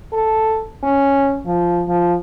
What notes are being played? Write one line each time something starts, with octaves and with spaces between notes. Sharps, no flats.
A4
C#4
F3
F3